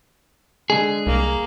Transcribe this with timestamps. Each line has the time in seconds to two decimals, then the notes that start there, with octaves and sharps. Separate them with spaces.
0.70 D3 G#3 G#4
1.06 C2 A#3